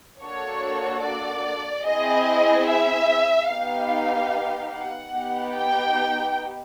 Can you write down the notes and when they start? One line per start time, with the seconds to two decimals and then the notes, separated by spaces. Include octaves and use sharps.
0.22 A#3 D4 F#4 A4 C#5
1.04 D5
1.86 C4 E4 G#4 D#5
2.67 E5
3.50 B3 D#4 G4 F5
4.73 F#5
5.14 B3 D#4 G4
5.55 G5